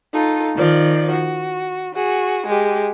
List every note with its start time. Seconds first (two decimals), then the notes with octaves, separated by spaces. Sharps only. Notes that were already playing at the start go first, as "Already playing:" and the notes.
0.13 D#4 F4 A4
0.56 D#3 F3 D5
1.11 F#4
1.94 F#4 G#4
2.46 G#3 G4